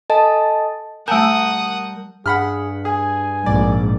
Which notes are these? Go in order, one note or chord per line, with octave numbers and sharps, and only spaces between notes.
A4 D#5 G#5 A5
G3 A3 A#4 F#5 G#5 A5 D#6 G6
G2 G#4 F#5 B5 F6
G#4 G#5
A#1 G#2 D5